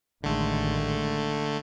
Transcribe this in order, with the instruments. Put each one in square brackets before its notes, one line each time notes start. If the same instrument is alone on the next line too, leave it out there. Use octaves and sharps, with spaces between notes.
[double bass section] A1 D#3 G#3 [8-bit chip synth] D3 A3